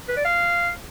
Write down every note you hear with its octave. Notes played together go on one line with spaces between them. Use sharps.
B4
D5
F5